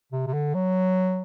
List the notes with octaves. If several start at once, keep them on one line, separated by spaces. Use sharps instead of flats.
C3
C3
D3
F#3